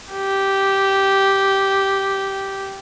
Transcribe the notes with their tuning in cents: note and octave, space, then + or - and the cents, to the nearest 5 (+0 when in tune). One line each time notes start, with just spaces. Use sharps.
G4 -10